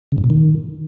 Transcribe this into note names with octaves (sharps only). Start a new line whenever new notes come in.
C#3
G2
A#2
D#3